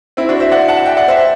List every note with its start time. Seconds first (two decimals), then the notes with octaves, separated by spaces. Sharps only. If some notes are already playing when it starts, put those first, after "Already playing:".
0.17 C4 E4
0.29 D4 F#4
0.40 C5 E5
0.52 D5 F#5
0.68 F#5 A5
0.85 E5 G5
0.97 D5 F#5
1.08 C5 E5